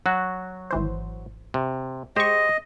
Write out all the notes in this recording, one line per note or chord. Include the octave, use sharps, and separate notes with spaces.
F#3 F#4
G#1 E3 C5
C3
G#3 G4 C5 D#5 C#6